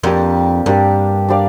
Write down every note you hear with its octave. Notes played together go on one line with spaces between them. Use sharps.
F2 A#3 D4 G4 D5
G2 A#3 D4 G4 D5
D4 G4 D5 F5